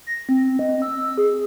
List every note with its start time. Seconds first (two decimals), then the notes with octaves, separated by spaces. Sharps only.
0.07 A#6
0.29 C4
0.59 D#5
0.82 E6
1.18 G#4